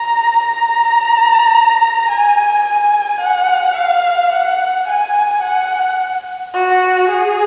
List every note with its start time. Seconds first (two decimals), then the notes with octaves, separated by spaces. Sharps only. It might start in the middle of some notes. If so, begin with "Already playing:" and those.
Already playing: A#5
0.44 A#5
2.09 G#5
2.65 G#5
3.21 F#5
3.76 F5
4.32 F#5
4.88 G#5
5.43 F#5
6.54 F#4
7.09 G#4